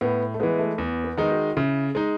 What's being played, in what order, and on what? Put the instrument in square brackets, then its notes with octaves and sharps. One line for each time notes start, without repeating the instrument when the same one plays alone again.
[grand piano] A2 [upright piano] B3
[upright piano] A3
[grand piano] E3 G#3 [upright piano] B3
[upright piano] A3
[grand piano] E2 [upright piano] B3
[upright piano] B3
[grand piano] D#3 G#3 D#4
[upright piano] F#4
[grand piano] C#3 [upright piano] E4
[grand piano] G#3 D#4